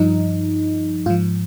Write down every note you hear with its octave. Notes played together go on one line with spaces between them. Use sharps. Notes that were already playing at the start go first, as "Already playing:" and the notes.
Already playing: G2 F3 D#4
G#2 F3 F4